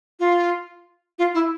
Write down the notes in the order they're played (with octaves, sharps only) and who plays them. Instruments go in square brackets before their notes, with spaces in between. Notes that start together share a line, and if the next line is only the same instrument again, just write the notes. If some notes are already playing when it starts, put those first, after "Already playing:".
[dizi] F4
F4
E4